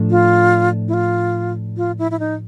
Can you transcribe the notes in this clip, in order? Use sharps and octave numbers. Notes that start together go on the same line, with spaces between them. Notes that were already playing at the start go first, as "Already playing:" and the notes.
Already playing: A2 F3 A3 D4
F4
E4
F4
F4
E4
E4
D#4